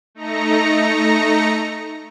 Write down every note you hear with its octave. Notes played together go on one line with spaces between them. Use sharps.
A3 D#4 A#5 A#6 C#7